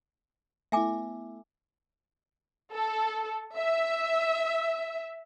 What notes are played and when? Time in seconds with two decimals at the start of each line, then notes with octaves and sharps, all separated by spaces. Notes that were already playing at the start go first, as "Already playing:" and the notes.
0.72 A3 B3 E4 E5 G#5 D6
2.72 A4
3.57 E5